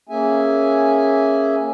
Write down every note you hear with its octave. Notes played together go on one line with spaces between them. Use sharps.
A#3 C#4 G#4 E5 G#5